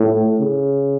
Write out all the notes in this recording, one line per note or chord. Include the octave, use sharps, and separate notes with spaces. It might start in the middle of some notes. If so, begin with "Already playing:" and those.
Already playing: A2
C#3